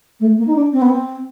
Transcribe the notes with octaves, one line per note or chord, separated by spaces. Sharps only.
A3
A#3
D#4
D4
C4
B3
C4